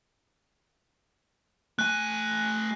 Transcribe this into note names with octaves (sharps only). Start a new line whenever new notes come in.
A3 G#5 F#6